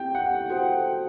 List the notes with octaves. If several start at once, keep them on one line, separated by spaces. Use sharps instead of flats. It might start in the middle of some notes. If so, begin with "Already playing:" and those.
Already playing: C4 E4 G4 G5
F#5
F#4 A4 C5 G5